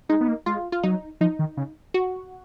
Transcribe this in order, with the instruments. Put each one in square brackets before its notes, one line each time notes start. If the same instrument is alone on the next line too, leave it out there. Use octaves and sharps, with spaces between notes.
[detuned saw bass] G#3 [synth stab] D#4
[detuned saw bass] B3
A#3
[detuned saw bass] G#3 [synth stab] F4
[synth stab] F4
[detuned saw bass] F#3 [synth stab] D#4
[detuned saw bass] F3 [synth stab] D#4
[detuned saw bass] D#3
C#3
[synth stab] F#4